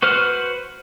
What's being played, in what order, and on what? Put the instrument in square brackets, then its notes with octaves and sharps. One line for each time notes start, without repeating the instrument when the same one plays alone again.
[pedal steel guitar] F#4 B4 C5 F6